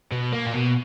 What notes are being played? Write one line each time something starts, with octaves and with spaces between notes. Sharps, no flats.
B2
A#3
A#2
B2